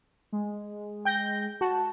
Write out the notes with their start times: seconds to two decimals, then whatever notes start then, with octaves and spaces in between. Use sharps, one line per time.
0.32 G#3
1.05 G5 G6 A#6
1.61 F#4 A5